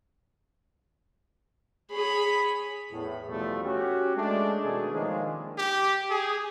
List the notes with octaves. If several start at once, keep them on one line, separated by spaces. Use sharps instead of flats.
G#4 C#5 B5
E2 A2
E2 B2 F3 G3 A3
C#4 F#4 G4
G#3 A3 D4
B2 D#3 A3 G#4
D#3 F3 G#3 A#3 C#4 D4
G4
G#4